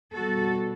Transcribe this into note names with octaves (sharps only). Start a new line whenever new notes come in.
B2 G3 F#4 A4